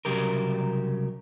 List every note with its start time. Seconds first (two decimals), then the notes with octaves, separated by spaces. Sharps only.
0.05 C2 C#3 F#3 G4 A#4